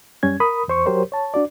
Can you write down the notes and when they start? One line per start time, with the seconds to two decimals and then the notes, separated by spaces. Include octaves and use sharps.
0.23 F#2 G3 C#4 G#6
0.40 A#4 B5 D#6
0.68 E2 C5 C#6
0.86 F#3 F#4 G4 A#4 C5 C#5
1.12 C#5 A5
1.34 D4 F#4 D5